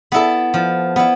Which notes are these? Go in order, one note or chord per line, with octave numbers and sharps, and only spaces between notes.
B3 E4 A4
F3
B3 E4